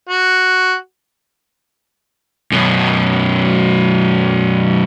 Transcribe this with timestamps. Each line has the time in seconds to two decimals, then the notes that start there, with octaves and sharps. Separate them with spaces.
0.09 F#4
2.52 F#2 B2